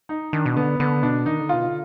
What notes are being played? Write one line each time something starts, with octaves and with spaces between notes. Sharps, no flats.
D#4
D#3 D4
B2
D3 B3
D3 B3
B2 D4
D#3 D#4
D3
B2 F4
D3